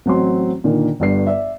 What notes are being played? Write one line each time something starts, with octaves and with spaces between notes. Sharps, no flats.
A1 F#3 C4 C6
A#2 D3 D#3
G1 G2 C7
D5 E5